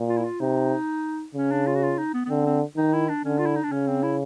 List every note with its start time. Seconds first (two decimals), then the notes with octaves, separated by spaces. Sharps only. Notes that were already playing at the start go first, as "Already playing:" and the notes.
Already playing: A#2
0.09 F4
0.18 E4
0.25 F4
0.40 C3 D#4
1.35 C#3 C#4
1.51 D4
1.67 F4
1.75 F#4
1.83 F4
1.98 D#4
2.13 B3
2.26 B3
2.30 D3 C4
2.46 C4
2.77 D#3 D#4
2.93 E4
3.08 D4
3.25 D3 C#4
3.38 F4
3.46 E4
3.55 D#4
3.63 D4
3.71 C#3 C#4
3.87 C4
4.03 E4